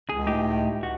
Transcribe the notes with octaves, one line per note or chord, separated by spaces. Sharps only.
C#2 G#4
A2 D#4 G4
F#4